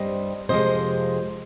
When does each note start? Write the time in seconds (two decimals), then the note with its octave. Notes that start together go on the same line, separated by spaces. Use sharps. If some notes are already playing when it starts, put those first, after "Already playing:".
Already playing: G2 G3 C4 C5 D#5
0.49 F2 C3 F3 G#3 C5 D#5